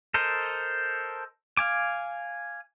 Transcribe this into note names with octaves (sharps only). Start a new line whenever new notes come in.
A4 A#4 C5 D#5
F5 G#5 D6